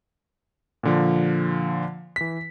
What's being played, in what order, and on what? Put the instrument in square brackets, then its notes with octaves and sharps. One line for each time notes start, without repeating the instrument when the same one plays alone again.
[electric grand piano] A#2 D3 F3
E3 B6